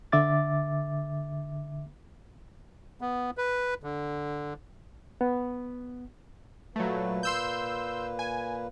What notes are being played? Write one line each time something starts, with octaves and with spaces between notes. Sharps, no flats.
D3 E5 D6 A6
B3
B4
D3
B3
A#2 F#3 A3 A#3 B4
C6 E6 G6
G#5